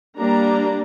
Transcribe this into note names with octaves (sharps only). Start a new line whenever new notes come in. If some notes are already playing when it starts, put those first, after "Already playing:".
G3 A#3 D4 A#5